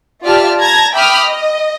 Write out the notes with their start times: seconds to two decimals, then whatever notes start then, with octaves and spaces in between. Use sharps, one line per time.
0.24 F4 G4 D5 E5 A5 F6
0.58 A5 A#5 G#6 A#6
0.93 E5 G5 B5 D6 D#6 F6
1.25 D#5